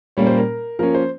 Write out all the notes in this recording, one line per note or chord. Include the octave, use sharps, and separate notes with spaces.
A#2 G3 A#3 C#4 C#5
C5
A#4
F3 A#3 C#4 A#4
C5